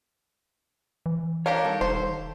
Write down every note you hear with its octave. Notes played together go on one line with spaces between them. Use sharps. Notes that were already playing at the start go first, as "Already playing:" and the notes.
E3
D4 G4 A#4 C#5 F5
G2 D#3 A4
E1 C5